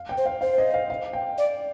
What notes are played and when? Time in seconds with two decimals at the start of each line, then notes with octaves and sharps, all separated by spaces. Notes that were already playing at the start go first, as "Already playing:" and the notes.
Already playing: F5
0.09 G5
0.17 C5
0.26 F5
0.41 C5 F5
0.58 D#5
0.74 F5
0.90 F5
1.13 G5
1.38 D5